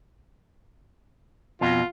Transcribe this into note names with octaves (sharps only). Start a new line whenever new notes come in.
F2 B2 F4